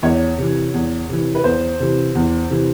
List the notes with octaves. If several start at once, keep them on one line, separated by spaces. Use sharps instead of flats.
E2 C#5
C3 E3
E2
C3 E3
B4
E2 C5
C3 E3
E2
C3 E3